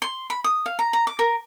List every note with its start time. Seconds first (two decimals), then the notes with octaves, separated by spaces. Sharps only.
0.02 C6
0.30 B5
0.44 D#6
0.66 F5
0.79 A#5
0.93 A#5
1.07 D6
1.19 A#4